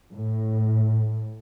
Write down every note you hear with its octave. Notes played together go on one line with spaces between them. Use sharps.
A2